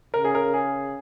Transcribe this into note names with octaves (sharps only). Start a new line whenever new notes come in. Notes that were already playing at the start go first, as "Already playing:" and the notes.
C#3 A#4
G#4
A#4
G#4